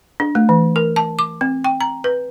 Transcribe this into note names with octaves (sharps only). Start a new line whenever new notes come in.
D4
A3
E3
A#4
A5
D6
C4
G5
A#5
B4